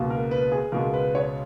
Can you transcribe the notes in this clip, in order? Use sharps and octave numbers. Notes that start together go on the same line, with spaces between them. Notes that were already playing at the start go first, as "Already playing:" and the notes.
Already playing: C#2 B2 A#3
A#4
B4
G#4
C#2 B2 G#3 A#4
B4
C#5